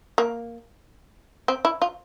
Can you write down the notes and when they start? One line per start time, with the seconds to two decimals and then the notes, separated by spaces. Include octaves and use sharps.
0.18 A#3
1.48 C4
1.65 E4
1.82 F4